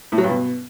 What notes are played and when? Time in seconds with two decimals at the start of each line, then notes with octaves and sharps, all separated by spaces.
0.12 A2
0.18 F#3
0.24 G2
0.30 B2